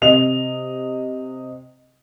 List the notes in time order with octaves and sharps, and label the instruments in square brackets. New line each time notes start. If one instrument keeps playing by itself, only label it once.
[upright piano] C3 D#5 F7